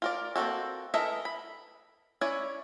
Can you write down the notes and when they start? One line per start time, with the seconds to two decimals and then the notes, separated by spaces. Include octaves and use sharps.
0.02 F4 A#4 D5
0.36 A#3 C4 D#4 F#4 A4
0.94 E3 A4 A#4 D#5 E5
1.25 B5
2.21 C#4 E4 C#5 D5